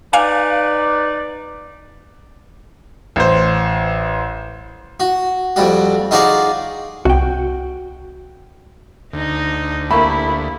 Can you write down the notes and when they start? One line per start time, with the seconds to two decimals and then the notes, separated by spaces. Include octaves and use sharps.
0.13 D#4 B4 D5 F5 G#5
3.16 A1 C5
5.00 F#4
5.56 F2 G3 F#4
6.11 D#4 F4 F#4 G#4 D5
7.05 C2 F#4 G5
9.13 D2 D#4 D#5
9.91 A3 A#3 E4 G4 B5